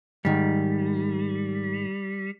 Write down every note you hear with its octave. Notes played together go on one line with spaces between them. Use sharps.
G#2 D#3 G3